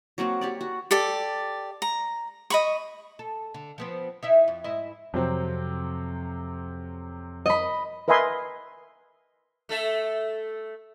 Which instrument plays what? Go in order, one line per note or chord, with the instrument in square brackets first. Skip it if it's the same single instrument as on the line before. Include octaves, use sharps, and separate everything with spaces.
[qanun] F#3 A#3 C4 F#4
G4 C#5 D5
F#4
[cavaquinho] G4 A4 D5
A#5
D#5 B5 C#6
[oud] A4
D3
F3 B3 C4
D#4 E4 E5
F2
G#2 E4 D#5
[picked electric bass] F2 [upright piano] C3 F#3 C4
[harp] D#5 B5
[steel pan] A#4 B4 D#5 E5 G#5 C6
[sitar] A3 A4 E5